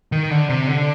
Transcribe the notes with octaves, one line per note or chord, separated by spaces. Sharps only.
D#3
D3
C3
D3